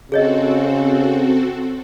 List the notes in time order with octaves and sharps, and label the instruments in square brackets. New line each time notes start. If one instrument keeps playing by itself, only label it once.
[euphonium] C#3 [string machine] C4 F#4 A4 [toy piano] G#4 C#5 D#5